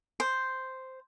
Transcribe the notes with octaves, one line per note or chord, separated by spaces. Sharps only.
C5